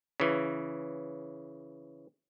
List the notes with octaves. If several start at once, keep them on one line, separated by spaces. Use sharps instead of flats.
C#3 E3